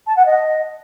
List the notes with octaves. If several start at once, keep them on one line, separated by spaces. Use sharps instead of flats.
A5
F#5
D#5